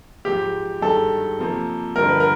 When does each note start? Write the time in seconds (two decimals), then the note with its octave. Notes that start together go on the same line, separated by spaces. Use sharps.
0.25 G#2 F3 G#3 G4
0.82 G2 D#3 G#3 A4
1.39 C3 F3 A#3
1.96 G2 D3 F3 A#4
2.08 B4
2.20 A#4